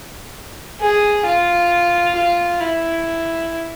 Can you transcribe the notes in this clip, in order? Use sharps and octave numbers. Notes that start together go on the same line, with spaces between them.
G#4
F4
F4
E4